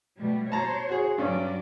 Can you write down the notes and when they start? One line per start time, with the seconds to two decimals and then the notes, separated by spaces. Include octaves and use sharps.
0.19 B2 G3 A3
0.52 C5 C#5 A5 A#5
0.89 F#4 G#4
1.18 G2 F#3 C#4 D5